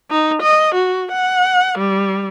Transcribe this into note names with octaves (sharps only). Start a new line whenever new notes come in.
D#4
D#5
F#4
F#5
G3